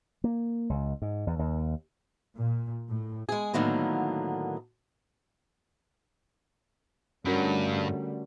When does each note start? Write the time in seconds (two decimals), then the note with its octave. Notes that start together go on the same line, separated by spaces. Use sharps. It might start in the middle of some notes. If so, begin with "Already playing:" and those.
0.24 A#3
0.70 C#2
1.02 G#2
1.27 E2
1.39 D#2
2.37 A#2
2.88 A2
3.29 G#3 G#4
3.53 A2 D3 D#3 F#3 A#3 B3
7.25 G2 D3 G3 A3 C#4 F#4 A#4